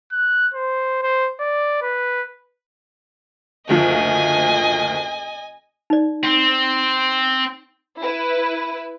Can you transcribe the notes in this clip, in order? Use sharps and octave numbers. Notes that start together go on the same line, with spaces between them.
F#6
C5
C5
D5
B4
F#1 D2 F3 D#5 G#5
D#4 D5
C4
E4 B4